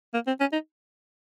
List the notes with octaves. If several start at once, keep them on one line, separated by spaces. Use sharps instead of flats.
A#3
C4
C#4
D#4